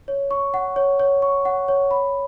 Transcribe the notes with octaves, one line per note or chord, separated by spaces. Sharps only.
C#5
C#6
F#5
C#5
C#5
C#6
F#5
C#5
B5